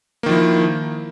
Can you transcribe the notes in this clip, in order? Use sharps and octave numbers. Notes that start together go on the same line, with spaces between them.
D#3 F3 A#3 E4